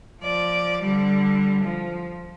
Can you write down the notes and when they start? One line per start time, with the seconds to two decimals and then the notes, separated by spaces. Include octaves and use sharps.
0.22 F3 D5
0.81 D3 G3
1.63 F3